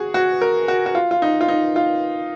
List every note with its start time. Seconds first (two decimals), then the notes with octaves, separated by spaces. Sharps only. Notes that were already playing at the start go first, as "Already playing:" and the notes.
Already playing: F#4 G#4
0.14 F#4
0.41 A#4
0.68 F#4
0.86 F#4
0.95 F4
1.11 F4
1.22 D#4
1.41 F4
1.48 D#4
1.76 F4